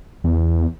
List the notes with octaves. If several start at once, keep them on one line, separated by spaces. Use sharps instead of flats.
E2